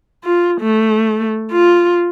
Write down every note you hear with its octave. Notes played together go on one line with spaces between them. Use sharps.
F4
A3
F4